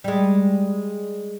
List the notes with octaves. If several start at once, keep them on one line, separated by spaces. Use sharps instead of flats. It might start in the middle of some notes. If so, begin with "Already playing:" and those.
G3 G#3